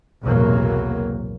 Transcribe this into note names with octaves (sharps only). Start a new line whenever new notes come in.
B1 E2 A2 C3 F#3 A#3